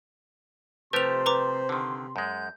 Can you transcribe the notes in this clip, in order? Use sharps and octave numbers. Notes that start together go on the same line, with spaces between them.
C3 F3 A3 G4 B4 C5 C6 F7
B4 A#5 D6
D3 D#3
F#2 G#3 G6